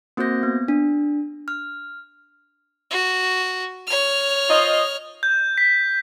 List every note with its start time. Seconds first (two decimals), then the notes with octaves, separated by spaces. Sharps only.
0.17 A#3 C4 F#4 C5 G6 A#6
0.43 B3
0.68 D4
1.48 F6
2.91 F#4
3.87 C#5 F6
4.50 F4 C5 D#5
5.23 G6
5.58 B6